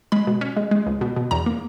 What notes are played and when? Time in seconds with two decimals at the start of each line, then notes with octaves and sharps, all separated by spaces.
0.12 G#3 B5
0.27 B2
0.41 C#4
0.57 G#3
0.71 G#3
0.86 C#2
1.01 B2
1.16 B2
1.31 E2 A#5
1.46 A#3